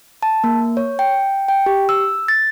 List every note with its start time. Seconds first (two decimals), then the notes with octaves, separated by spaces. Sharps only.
0.23 A5
0.44 A#3
0.77 C#5
0.99 G5
1.48 G5
1.66 G4
1.89 E6
2.28 A6